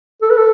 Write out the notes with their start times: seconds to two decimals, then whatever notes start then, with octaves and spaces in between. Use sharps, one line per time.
0.22 A4
0.30 B4
0.37 A4